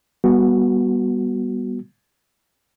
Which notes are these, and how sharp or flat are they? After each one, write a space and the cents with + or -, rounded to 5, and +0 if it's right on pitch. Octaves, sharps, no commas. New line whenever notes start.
G3 +0 B3 -25 F#4 +0